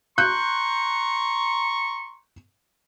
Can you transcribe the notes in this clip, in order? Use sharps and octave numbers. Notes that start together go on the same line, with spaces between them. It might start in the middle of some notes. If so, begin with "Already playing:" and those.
A#5 C6 C#6 F#6 G6